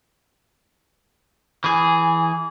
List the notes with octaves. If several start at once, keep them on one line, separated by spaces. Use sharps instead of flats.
E3 G#4